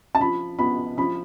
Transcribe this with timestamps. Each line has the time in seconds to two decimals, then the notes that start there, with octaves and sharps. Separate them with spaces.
0.15 A5
0.20 F3 B5
0.59 B3 B5
0.98 F3 B5